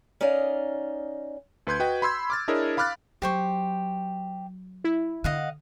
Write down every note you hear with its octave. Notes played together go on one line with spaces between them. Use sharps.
C#4 D#4 D5 D#5 F5
D2 B4 C6 G6 G#6
F#4 B4 D#5 G5
B5 C6 E6 G#6
D6 F6 A6
D4 E4 G#4 A#4 C#5 D#5
F5 B5 D6 F6 F#6 A6
F#3 G4 C5 C#6
E4
D3 D#5 F5 F#5